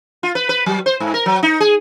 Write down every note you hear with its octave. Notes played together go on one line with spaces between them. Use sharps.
F4
B4
B4
F#3
C5
G#2
A#4
F#3
D#4
G#4